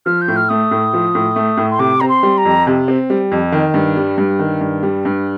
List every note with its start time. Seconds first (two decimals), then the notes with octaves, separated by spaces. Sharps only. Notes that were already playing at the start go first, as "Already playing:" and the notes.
0.06 F3 F6
0.21 G6
0.28 A2
0.36 F6
0.49 A3 D#6
0.71 A2
0.93 F3
1.15 A2
1.36 A3
1.57 A2
1.71 C6
1.79 C3 D6
2.00 C4 A#5
2.09 C6
2.23 G3
2.38 A#5
2.45 F2
2.67 C3
2.88 C4
3.10 G3
3.31 F2
3.52 D#3
3.74 G2
3.97 G3
4.18 G2
4.39 D#3
4.61 G2
4.83 G3
5.05 G2